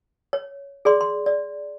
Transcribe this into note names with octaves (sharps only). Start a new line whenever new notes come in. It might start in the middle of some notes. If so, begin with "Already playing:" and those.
C#5
G#4 D5 C6
C6
D5